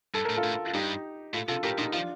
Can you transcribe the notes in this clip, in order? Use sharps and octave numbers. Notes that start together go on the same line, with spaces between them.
G2 A4
A2 A#4
F4 A4
A2
F4
G2 D#4 G4
A2 F4 A4
C3 F4 A4
A2 G4 A#4
A#2 D#4 G4
F3 D4 F4